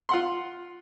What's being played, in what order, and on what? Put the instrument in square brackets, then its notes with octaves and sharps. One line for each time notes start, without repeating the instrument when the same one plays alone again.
[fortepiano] F4 F#5 C6